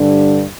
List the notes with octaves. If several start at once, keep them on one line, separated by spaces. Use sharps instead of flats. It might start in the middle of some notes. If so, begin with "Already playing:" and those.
Already playing: G2 D3 G3 D4